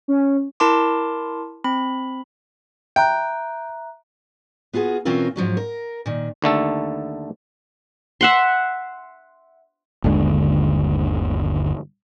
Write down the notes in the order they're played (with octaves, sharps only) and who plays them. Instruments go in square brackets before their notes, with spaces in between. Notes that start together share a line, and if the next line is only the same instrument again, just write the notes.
[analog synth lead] C#4
[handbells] E4 A#4 A5 C6 D6
C4 B5
[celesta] E5 A#5 F#6 [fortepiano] G5
[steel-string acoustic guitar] B3 F4 F#4 G#4
B2 E3 C4 C#4 F4 A#4
G#2 F3 F#3 C#4
A#4
A#2 D#3
[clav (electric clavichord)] D#2 D3 A3 A4
[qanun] E5 F#5 C6
[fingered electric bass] G1 D#2 D3 G#3